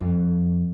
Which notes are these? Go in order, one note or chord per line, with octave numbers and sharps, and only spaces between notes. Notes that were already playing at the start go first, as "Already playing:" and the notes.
F2